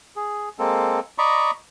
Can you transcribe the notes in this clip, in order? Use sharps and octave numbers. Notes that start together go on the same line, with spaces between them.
G#4
G#3 A#3 C4 A4
D5 D#5 A#5 B5 C#6